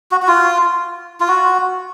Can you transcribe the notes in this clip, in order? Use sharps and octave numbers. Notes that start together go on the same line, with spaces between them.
F#4
F#4
F4
F4
F#4